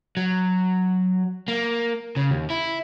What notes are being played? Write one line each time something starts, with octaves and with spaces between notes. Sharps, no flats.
F#3
A#3
C#3
D#2
E4